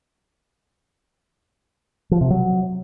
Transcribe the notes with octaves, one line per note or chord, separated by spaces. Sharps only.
F3
C3
F#3